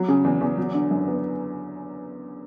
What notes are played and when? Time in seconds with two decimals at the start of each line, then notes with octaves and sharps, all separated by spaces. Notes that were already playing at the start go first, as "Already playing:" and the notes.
Already playing: F#3
0.08 C#3
0.24 E2
0.41 E2
0.57 F#3
0.74 D3
0.91 F#2
1.07 B3